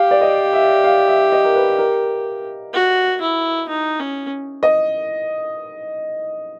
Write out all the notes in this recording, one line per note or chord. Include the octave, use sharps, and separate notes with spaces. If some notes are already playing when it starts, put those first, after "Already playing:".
Already playing: G4 F5
D5
D#5
E5
F5
E5
D#5
A#4
B4
A#4
F#4
E4
D#4
C#4
D#5